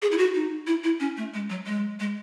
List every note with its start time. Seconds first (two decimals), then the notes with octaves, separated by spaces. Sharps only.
0.02 G#4
0.12 E4
0.18 F#4
0.34 D#4
0.67 E4
0.84 E4
1.00 C#4
1.17 A3
1.34 G#3
1.50 F#3
1.66 G#3
2.00 G#3